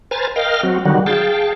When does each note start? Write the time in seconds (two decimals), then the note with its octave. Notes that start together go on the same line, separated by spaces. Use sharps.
0.11 B4 C5 G#5 A#5 F6 A6
0.36 A#4 D#5 F5 G5 F6
0.63 F#3 C4 F#4
0.85 D3 D#3 F#3 G3 F#4
1.06 G#4 F5 G5 A5